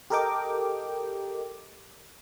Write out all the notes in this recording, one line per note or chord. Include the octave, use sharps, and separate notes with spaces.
G4 A4 A#4 D#5 G5 D6